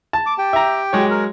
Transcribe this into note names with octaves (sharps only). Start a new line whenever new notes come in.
A5
D6
G4 G5
E5 A#5
F#3 G#3 C#5
A#4